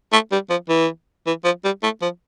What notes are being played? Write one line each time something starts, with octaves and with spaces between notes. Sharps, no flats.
A3
G3
F3
E3
E3
F3
G3
A3
F3